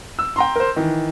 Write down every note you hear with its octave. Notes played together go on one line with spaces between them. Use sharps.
E6
G5 A#5 C6
A#4 C5
D#3 E3